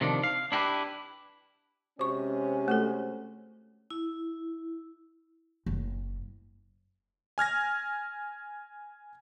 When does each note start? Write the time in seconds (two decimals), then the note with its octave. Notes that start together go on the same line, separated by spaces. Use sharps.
0.01 C3 D#3 F3 D4
0.23 F5
0.52 D4 E4 G4 A#4 B4
1.99 C3 G#3 C#4 F#4 C#6
2.68 A3 F#4 A4
3.90 E4
5.66 F#1
7.38 G#5 F6 G#6 A#6